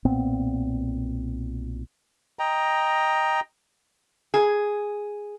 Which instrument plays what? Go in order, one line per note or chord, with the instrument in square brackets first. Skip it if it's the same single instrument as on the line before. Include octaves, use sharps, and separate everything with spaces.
[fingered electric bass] B1 A#2 B3 C4
[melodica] D#5 G5 A#5
[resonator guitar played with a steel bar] G#4